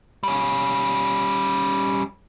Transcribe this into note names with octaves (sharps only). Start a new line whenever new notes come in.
G3 C#4